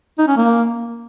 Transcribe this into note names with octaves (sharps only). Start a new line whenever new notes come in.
D#4
C#4
A#3